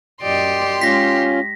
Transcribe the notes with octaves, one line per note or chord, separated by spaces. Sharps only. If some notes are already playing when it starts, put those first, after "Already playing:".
F#2 G4 D5 D#5 C6
G#3 C#4 F4 A#6 B6